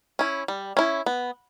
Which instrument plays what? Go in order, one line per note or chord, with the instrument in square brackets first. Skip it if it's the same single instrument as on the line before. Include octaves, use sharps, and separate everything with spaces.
[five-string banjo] C#4 E4
G3
C#4 E4
B3